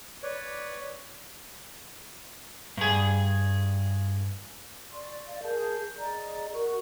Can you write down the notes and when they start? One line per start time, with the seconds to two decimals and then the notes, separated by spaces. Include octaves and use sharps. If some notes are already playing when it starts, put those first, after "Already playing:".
0.23 B4 C#5 D5
2.77 G2 G#4
4.92 D5 C6 C#6
5.27 D5 D#5 F5
5.43 G#4 A#4 A5 G6
5.97 G#4 D5 D#5 A#5
6.53 F#4 A#4 C#6